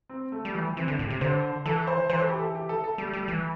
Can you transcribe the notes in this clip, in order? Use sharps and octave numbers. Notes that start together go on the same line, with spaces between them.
C4
A3
G3
E3
E3 C4
D3
A2
C3 G4
D3 C5
E3 A4
C5
E3 C5
A4
G4
A4
G4
A4
A4
G3 A3
G3
E3